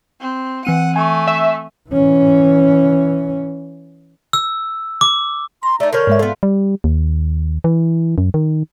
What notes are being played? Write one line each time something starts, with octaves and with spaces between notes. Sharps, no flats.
C4
E3 C4 F#5 D#7
A3 G#5 C#6
E5
E3 C#4
E6
D6
A#5 C6
A3 D#4 D5
D3 A#4 C#5 C#6 F6 G6
G#2 G#3 E5
B3 F4 A4
G3
D#2
E3
F#2
D#3